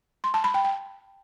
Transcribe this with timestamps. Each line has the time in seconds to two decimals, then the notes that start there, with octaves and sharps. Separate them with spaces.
0.24 C6
0.34 A5
0.44 B5
0.54 G5
0.64 G5